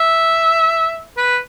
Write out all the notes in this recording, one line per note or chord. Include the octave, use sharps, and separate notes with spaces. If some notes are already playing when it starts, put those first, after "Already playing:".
Already playing: E5
B4